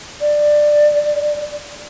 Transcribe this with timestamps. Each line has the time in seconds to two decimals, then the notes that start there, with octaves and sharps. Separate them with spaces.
0.21 D5